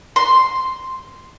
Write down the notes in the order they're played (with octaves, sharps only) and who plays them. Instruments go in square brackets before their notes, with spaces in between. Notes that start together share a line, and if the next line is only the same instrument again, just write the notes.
[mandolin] C6